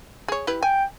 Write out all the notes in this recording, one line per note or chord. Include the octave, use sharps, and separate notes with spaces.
G#4 C#5
E4 G4 B4
G5 G#5